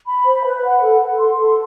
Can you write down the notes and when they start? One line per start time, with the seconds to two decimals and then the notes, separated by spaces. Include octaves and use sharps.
0.07 B5
0.26 C5
0.44 B4
0.63 F#5
0.81 A4
1.00 A4
1.19 C6
1.38 A4